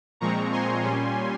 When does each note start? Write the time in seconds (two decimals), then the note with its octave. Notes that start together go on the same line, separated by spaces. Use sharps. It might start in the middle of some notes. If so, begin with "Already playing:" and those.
0.21 A#2 F3 G#3 C4 A#5 C#6
0.52 G#5 C6
0.83 A#2 G3 C#4